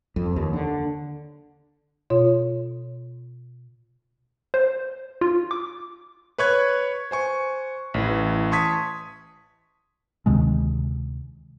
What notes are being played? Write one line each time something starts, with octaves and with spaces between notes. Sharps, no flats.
F2
D#2
D3
B2 F4 C#5
C5
F4
D6
B4 C#5 C#6 F#6 G#6
C5 G#5 C#6
A1 E3
A5 C6 C#6 D#6 G#6 B6
D2 C3 D#3 G#3